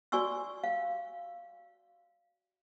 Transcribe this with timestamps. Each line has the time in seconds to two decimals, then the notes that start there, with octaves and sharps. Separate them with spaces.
0.12 F#4 D5 G#5 C#6 E6
0.64 F5